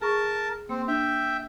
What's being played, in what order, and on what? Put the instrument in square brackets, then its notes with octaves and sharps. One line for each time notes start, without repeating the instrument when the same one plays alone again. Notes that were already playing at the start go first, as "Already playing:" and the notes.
[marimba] G#4 C#6 [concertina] A#4 A5
[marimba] A#3 [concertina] C4
[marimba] D4 [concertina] E5 G5